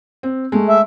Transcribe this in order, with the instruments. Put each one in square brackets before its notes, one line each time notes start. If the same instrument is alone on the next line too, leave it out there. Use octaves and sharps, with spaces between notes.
[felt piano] C4
G#3 A3
[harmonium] E5